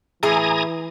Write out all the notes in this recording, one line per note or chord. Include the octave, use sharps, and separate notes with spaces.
A2 E3 E4 G#4 G#5 A#5 D#6